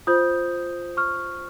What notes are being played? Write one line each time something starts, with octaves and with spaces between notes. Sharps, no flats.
F4 C5 D#6 G6
C#6 F6